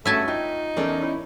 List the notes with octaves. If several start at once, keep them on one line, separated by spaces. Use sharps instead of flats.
G2 A3 C#4 F#4 E5 G#5 A5
D#4 F4 G5
E2 C#4 A4 A#4 D5
E4 C#5